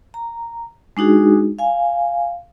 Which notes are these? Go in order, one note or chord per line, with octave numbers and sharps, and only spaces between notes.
A#5
G#3 D4 D#4 F#4 G#4
F5 G#5